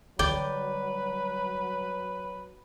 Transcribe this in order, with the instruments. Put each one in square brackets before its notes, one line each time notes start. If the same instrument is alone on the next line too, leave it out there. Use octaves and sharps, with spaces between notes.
[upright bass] D3 G3 [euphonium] F#3 [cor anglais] B4 [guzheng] D5 G5